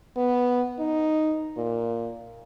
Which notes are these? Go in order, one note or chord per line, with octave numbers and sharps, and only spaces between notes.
B3
D#4
A#2